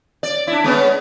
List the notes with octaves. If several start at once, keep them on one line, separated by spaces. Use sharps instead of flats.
D5
D4 E4
G#3 B3 C#4